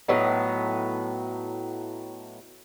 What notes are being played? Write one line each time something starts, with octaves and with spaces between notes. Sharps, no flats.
A2 F#3 B3 D#4